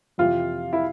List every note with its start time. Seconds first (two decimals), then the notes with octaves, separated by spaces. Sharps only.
0.18 F2 C3 E3 F4
0.73 E4